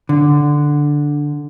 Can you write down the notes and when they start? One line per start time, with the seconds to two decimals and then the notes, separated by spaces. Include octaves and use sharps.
0.09 D3